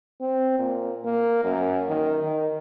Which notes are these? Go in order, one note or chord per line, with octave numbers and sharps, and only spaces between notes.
C4
A#2
A#3
F#2
D#3
D#3